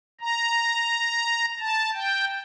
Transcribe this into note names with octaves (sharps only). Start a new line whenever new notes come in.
A#5
A5
G5